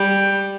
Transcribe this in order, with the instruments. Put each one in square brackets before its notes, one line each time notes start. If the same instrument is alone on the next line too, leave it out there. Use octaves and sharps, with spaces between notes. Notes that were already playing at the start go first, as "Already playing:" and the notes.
Already playing: [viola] G3